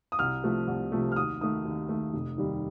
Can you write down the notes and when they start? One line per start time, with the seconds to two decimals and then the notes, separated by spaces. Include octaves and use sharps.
0.12 D#6
0.19 C2 F6
0.44 C3 F3 A3
0.67 C2
0.92 C3 F3 A3
1.12 F6
1.16 D#2 D#6
1.41 D#3 A3 D#6
1.65 D#2
1.89 D#3 A3
2.14 F1
2.38 D#2 D#3 G3